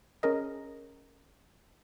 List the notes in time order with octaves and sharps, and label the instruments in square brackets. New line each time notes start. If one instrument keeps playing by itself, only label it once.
[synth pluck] C#4 G#4 A#4 D#5